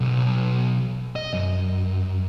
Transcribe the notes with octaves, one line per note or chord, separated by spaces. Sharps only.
B1
D#5
F#2